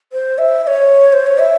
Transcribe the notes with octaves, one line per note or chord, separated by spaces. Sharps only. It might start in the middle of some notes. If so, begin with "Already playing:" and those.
C5
E5
E5
C#5
C5
C#5
E5